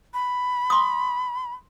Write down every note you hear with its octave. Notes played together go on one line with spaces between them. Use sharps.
B5
C6 D#6